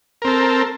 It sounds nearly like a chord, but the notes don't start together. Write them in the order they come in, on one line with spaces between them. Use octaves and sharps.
A#4 C4 A4